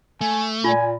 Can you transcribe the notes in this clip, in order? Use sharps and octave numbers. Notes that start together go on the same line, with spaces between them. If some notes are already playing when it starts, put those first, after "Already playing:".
A3 G#5
A#2 F4 G#5